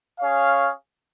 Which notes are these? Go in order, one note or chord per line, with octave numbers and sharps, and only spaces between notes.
C#4 G#4 C#5 F5